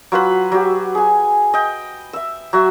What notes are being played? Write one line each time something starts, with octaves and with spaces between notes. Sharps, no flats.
F#3 F4 B4 B5
F#3 G4
G#4 G#5
D#5 G5
E5 E6
F#3 F#4 E5